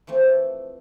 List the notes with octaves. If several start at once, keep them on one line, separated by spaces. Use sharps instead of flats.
E3 F3 A3 C4